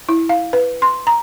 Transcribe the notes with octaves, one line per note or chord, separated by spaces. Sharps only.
E4
F5
B4
C6
A#5